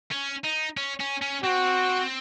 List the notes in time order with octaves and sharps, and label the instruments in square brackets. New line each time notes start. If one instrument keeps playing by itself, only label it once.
[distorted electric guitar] C#4
D#4
C#4
C#4
C#4
[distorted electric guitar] C4 [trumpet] F#4